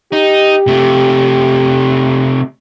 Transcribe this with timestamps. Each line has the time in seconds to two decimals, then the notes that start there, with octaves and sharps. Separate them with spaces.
0.13 D#4 G4
0.67 C3 A3